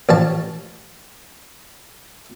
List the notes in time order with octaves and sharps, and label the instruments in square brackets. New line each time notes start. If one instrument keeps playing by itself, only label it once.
[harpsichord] A1 F3 A5